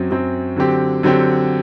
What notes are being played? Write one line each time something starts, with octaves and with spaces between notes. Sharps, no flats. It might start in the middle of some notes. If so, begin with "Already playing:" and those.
Already playing: F#2 F#3 C4
F#2 F#3 C4
D3 F#3 C4 G4
D3 F#3 C4 G4